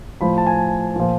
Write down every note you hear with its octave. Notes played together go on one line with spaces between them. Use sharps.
A2 F3 B5
A5
G#5
A#2 F3